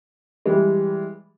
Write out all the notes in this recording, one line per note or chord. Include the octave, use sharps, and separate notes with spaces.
E3 G3 G#3